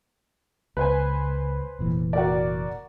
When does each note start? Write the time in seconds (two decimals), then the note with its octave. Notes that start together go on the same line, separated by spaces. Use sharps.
0.77 C#2 B4 C5 G#5
1.79 F1 A#2 E3
2.13 F#4 A#4 D5